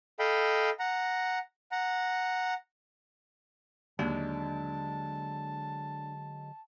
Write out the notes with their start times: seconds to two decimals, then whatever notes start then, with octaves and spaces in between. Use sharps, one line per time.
0.19 A4 D#5 F5 G5 B5
0.79 F#5 A#5
1.72 F#5 A#5
3.99 D#2 D3 F#3 G#3 D4 A5